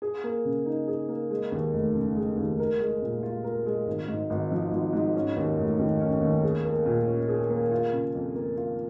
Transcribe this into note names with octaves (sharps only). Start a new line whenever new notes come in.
G#4
A#3
C#3
D#4
G#4
A#3
G#3
D#2
F1
C#3
G#3
D#2
A#4
G#3
A#2
F4
A#4
G#3
G#1
G#2
G#1
F3
G#1
G#2
C#4
D#2
F1
D#3
C#4
D#2
G#4
A#3
A#2
C#4
G#4
A#3
F4
C#3
F2
A#3
F4